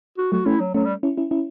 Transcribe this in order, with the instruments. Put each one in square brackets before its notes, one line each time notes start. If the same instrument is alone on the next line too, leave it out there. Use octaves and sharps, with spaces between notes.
[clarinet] F#4
[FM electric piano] F#3 A3 [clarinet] F#4
[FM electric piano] A3 C#4 [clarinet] E4
[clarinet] F#3
[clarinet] F#3 [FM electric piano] A3 C#4
[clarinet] G3
[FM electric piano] C#4 E4
C#4 E4
C#4 E4